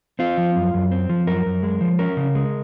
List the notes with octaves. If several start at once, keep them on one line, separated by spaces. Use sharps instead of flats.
C4 F4
F3
F#2
F#2
C4
F3
F#2 A#4
F#2
G#3
F3
C#4 A#4
C#3
G#3